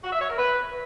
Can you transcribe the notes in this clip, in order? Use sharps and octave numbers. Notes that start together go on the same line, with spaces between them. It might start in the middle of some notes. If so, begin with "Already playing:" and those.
F#4
E5
C#5
A#4
B4